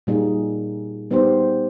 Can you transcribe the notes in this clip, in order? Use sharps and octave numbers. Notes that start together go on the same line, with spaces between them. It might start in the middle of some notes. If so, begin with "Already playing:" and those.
A#2 G3 A#3 D#4 G#4
G3 B3 D#4 G4 C5